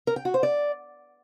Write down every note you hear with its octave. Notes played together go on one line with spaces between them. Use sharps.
A#4
G5
F#4
C5
D5